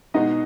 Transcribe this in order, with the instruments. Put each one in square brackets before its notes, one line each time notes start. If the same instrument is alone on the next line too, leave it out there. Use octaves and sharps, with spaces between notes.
[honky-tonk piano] B2 G#3 B3 F#4 D#5 [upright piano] D#4